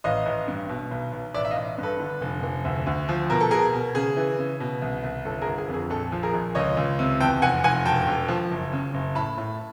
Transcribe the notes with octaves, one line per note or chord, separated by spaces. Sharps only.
A1 D#5 F5
A1
G2
B2
B1
B1
A1 D5 E5
E5
D#5 F5
A1
G2
A4 B4
D3
F1
F1
D2
D2
F3
B2 A#4
A4
B2 G#4 A#4
B2
C#3 G#4
E3
C#3
B2
C2
C2
G1 A4
G#4 A#4
G1
G#4
F2
G#4
A#1 A4
F3
G#4 A#4
A#1
C#2 C#5 D#5
C#2
C3
E2 G5 A5
F1 F#5 G#5
F1 F#5 G#5
E1 G5 A5
E1
F3
F#1
C#3
F#1
A2 A5 B5
A2